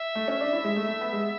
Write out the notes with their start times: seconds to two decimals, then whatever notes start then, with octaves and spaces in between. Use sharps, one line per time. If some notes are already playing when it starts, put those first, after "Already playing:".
Already playing: E5
0.15 A3
0.28 C#4
0.41 D4
0.53 E4
0.64 G#3
0.76 A3
0.88 A3
1.01 B3
1.12 G#3